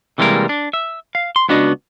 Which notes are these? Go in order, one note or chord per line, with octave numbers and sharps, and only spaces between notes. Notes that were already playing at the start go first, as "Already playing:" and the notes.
C3 E3 G3 G#3 A#3 A#4
D4
E5
F5
C6
C#2 B3 D4 F#4 D#5